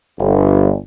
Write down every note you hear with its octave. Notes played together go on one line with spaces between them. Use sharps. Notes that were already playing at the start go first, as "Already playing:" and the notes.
G1